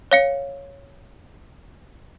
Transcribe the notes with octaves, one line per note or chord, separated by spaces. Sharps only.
C#5 F5 C#7